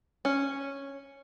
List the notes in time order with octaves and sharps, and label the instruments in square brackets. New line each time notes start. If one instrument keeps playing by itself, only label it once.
[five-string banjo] C#4